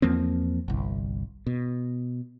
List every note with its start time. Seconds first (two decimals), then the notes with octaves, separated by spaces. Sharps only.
0.02 E2 F3 A#3 C4
0.68 G1 C2
1.47 B2